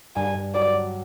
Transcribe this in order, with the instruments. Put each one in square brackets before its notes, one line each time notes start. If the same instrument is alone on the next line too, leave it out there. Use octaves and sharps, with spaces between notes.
[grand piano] G2 [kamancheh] G#5
[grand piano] G2
[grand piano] F#3 [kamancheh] D5
[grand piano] F#3